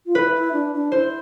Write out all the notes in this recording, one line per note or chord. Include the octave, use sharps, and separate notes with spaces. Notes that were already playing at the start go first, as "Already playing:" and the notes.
F4
E4 B4
E4
D4
D4
E4 C5